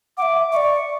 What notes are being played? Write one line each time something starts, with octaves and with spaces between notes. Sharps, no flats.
E5 F#5 D6
D5 E5 C#6